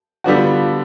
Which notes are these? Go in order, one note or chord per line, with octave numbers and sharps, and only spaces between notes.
D3 G3 B3 D4 F4 F#4